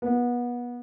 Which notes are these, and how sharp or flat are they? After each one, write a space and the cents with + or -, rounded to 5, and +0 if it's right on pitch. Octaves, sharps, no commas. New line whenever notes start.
B3 -25